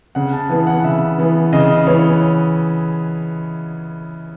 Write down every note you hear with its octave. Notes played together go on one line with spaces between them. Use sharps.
C#3 F#5
A5
E3 B3 G#5
F#5
C#3 E5
E3 B3
C#3 D#5
E3 B3 C#5